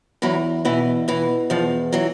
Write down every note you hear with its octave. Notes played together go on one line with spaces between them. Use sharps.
E2 E3 F#3
B2 E3
B2 E3
E2 F3
E3 F#3